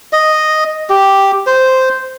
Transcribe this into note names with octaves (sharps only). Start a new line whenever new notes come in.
D#5
G4
C5